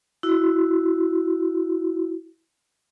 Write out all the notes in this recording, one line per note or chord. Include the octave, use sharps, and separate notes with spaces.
E4 F#4